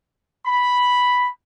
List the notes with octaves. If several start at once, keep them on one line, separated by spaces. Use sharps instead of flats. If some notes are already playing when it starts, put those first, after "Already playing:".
B5